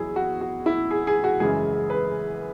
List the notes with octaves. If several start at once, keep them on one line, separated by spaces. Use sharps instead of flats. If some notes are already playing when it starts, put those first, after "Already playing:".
Already playing: E2 B2 F#3 E4 G#4
F#4
F#4
E4
G#4
G#4
F#4
F#2 C#3 E3 G#3 G#4
B4